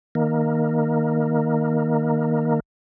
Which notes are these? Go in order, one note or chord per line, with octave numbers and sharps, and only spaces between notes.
D#3 A#3